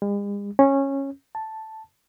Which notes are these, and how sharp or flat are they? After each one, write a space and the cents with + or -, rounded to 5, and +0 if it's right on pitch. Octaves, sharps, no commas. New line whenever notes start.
G#3 -45
C#4 -15
A5 +0